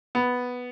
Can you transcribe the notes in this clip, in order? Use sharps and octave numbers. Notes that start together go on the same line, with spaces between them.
B3